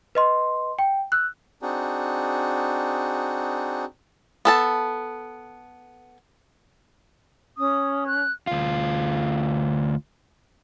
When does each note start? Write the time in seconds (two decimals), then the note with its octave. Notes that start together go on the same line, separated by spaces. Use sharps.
0.15 B4 D#5 C6
0.79 G5
1.12 E6 F#6
1.62 C4 D4 D#4 F#4 G#4
4.45 B3 A4 A5
7.58 C#4 D#6
8.07 F#6
8.47 D2 F4